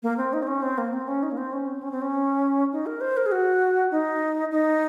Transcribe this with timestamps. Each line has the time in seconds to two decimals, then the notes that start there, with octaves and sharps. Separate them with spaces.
0.03 A#3
0.17 C4
0.33 D#4
0.43 C4
0.47 C#4
0.62 C4
0.78 A#3
0.93 C4
1.08 C#4
1.23 D#4
1.31 A#3
1.37 C4
1.53 C#4
1.67 C4
1.83 C#4
1.91 C4
2.02 C#4
2.72 D#4
2.86 A#4
3.01 C5
3.17 A#4
3.26 G#4
3.32 F#4
3.91 D#4
4.51 D#4